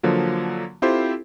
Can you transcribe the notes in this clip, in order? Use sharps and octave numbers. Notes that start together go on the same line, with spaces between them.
D3 F3 F#3 A#3
C4 E4 F4 G4 A4 C5